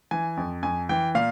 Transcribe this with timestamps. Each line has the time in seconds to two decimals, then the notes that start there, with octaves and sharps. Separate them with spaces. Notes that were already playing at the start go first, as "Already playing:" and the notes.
0.11 E3 G#5
0.37 F2
0.63 F2 G#5
0.89 E3 G5
1.15 A#2 F5